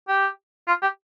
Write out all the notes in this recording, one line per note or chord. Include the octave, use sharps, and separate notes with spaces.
G4
F4
G4